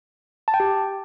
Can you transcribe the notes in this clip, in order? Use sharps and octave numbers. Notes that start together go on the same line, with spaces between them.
A5
G5
G4